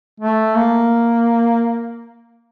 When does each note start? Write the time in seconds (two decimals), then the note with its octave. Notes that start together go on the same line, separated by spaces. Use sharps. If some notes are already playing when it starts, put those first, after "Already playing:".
0.20 A3
0.55 A#3